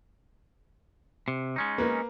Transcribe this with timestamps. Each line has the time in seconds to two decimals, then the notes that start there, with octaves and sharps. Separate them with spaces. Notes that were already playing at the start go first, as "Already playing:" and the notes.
1.28 C3
1.56 G#3 C#4 D#4
1.78 A#3 B4